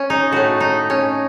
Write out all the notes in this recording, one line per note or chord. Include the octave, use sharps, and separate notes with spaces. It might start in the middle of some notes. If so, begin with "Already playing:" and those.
Already playing: C#4
D#4
A2 A3 F#4
D#4
C#4